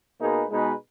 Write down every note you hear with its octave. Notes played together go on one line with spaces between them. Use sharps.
B2 A#3 D#4 G#4 B4
B2 G#3 D#4 G#4 B4